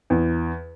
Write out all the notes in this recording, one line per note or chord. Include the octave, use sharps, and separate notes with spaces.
E2